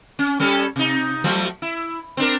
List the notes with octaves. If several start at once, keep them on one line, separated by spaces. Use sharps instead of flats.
C#4
G3 C#4 A4
C3 D#4
F3 F#3 A3
E4
C4 D4 A#4